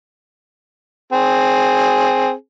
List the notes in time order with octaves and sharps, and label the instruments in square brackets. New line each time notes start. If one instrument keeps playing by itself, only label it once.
[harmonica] C4 G#4